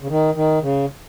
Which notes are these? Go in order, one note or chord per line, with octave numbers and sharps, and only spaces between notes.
C#3
D#3
D#3
C#3